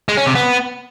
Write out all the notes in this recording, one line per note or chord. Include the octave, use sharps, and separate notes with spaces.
G#3
C#4
C3
B3